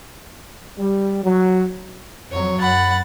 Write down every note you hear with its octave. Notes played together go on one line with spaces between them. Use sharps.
G3
F#3
F2 F#3 C#5
F#2 F#5 B5 A6